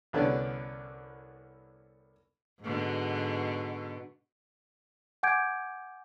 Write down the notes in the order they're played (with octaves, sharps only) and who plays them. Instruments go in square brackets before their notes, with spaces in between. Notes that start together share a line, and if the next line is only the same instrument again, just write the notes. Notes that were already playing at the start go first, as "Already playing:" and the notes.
[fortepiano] C2 D3 B3 C#4 D5
[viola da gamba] G#2 B2 D3
[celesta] F#5 G#5 D6 G6 G#6 D7